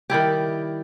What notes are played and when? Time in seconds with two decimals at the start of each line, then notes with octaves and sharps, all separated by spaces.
0.10 D#3 G3 E4 G4